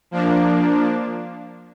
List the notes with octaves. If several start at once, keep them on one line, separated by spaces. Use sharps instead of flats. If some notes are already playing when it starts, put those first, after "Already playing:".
F3 A#3 D4